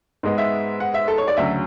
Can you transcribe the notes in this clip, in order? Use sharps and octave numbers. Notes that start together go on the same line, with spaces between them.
G#2 G#3 B3
E5
F#5
E5
A4
C#5
D5
D2 C#3 F#3 E5